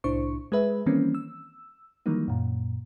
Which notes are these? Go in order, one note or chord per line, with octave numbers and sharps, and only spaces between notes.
C2 A2 D4 E4 C5 C#6
G#3 G#4 B4 E5
D#3 E3 G3 A#3 C4 C#4
E6
D#3 E3 F#3 G3 A#3 D#4
F#2 A#2